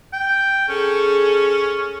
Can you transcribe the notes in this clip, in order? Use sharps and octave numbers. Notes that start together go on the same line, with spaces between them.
G5
C#4 G#4 A4